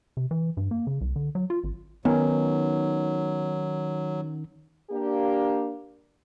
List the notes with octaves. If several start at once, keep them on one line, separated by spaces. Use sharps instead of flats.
C3
E3
G2
A#3
C#3
C2
D3
F#3
F4
G#1
D#3 F#3 B3 C#4 D#4
A#3 D4 G4